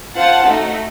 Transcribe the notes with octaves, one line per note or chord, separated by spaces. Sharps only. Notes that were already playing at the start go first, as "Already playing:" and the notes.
F4 C5 F#5 A5
A3 D#4 F#4